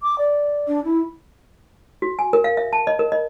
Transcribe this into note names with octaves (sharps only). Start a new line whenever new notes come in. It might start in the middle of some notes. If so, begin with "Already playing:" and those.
D6
D5
D4
E4
F#4
G#5
A#4
F5
E5
A5
D#5
A#4
D#5